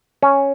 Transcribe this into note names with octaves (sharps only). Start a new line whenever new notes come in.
C#4